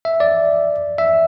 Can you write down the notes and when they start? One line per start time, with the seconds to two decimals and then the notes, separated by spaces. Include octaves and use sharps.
0.05 E5
0.20 D5
0.98 E5